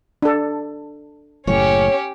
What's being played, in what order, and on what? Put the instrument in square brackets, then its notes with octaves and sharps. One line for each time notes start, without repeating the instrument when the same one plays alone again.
[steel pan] D4 A4
[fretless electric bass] F#1 A2 [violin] C#4 G4 [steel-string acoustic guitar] C#5